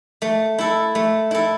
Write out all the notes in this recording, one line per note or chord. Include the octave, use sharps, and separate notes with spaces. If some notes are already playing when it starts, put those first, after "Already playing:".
A3
E4 A4
A3
E4 A4